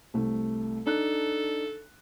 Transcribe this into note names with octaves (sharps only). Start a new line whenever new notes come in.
C2 A3
D4 D#4 A4 F#6